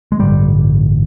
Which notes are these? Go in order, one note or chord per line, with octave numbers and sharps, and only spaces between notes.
G#3
A1 G2 D3 G3